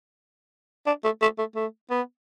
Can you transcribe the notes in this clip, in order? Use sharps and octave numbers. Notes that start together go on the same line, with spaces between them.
D4
A3
A3
A3
A3
B3